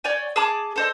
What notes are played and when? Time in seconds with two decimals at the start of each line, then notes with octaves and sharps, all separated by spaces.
0.04 C#5 D5 G5 G#5
0.36 G#4 A5 D6
0.76 A4 C5 D#5